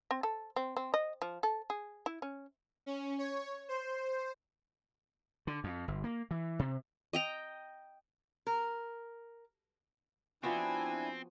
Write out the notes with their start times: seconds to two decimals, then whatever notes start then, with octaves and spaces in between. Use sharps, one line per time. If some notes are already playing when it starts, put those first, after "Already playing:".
0.11 C4
0.23 A4
0.56 C4
0.77 C4
0.94 D#5
1.22 F3
1.43 A4
1.70 G#4
2.06 E4
2.22 C#4
2.86 C#4
3.18 C#5
3.68 C5
5.47 D3
5.64 F2
5.88 G1
6.04 A#3
6.31 E3
6.59 C3
7.13 D#5 G5 A#5
8.47 A#4
10.43 F3 B3 C4 D4 E4 F#4 G#5